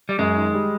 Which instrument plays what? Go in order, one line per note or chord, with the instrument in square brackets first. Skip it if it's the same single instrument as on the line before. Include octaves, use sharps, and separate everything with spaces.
[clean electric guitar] G3
[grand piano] F#2 [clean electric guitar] G#3
[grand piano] D#3
G3